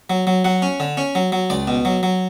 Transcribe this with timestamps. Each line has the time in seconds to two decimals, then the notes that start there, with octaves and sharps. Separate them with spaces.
0.10 F#3
0.27 F#3
0.45 F#3 F#5
0.62 C#4
0.80 D3
0.97 C#4
1.15 F#3
1.32 F#3
1.50 C#2 D5
1.68 B2
1.85 F#3
2.03 F#3